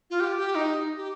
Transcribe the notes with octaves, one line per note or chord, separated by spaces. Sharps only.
F4
G4
G4
D#4
G4